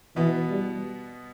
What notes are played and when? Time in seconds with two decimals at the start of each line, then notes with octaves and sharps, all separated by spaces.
0.16 B2 E3 B3
0.48 G3